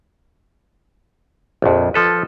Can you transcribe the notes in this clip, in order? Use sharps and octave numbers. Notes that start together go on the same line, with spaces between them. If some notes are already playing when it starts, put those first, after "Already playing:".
A#1 F2
F3 A4 B4